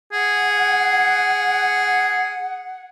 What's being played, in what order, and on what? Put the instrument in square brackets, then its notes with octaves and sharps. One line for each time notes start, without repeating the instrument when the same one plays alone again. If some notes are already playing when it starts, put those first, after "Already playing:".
[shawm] G#4 [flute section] F#5